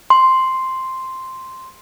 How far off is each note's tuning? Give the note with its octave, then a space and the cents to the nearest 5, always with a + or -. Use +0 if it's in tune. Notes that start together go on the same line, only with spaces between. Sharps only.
C6 +0